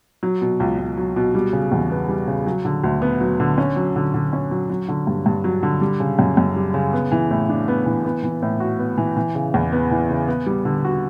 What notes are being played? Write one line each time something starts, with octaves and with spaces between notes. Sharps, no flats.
F#3
B2
C#2
C#2
F#3
B2
G3
C#3
E2
B3
G3
C#3
F#3
D3
D2
B3
F#3
D3
C#4
F#3
D3
D3
C#4
F#3
F#3
D3
G2
G2
F#3
D3
G3
C#3
F#2
F#2
G3
C#3
B3
E3
A2
D4
B3
E3
B3
E3
A2
F#4
B3
E3
E3
C#3
E2
B3
E3
C#3
B3
G3
D3
F#4